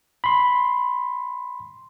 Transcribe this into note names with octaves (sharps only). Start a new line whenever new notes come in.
B5 C6